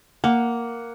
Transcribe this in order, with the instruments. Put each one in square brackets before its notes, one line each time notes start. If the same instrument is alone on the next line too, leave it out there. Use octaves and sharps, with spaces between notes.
[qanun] A#3 [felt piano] F#5